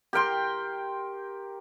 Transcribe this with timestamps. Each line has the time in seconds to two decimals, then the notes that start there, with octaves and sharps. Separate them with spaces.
0.13 G4 A#4 G5 C6